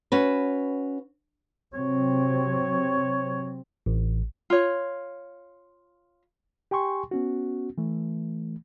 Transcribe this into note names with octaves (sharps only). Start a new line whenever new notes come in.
C#4 F#4 B4
C3 F#3 C4 C#5
A1
F4 C#5
G4 G5 G#5 C6 C#6
B3 C#4 F#4
E3 A3